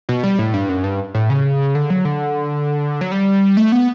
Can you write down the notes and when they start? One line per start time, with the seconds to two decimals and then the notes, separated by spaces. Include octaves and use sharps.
0.09 B2
0.24 G3
0.39 A2
0.54 G2
0.69 F#2
0.84 G2
1.15 A2
1.30 C#3
1.75 D3
1.90 F#3
2.05 D3
3.01 F#3
3.12 G3
3.57 A3
3.72 B3